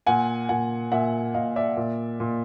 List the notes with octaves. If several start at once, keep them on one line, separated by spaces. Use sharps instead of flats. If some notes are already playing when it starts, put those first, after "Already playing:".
A#2 F#5 G#5
A#2 F#5 G#5
A#2 E5 F#5
A#2 D#5 F5
D5 E5
A#2
A#2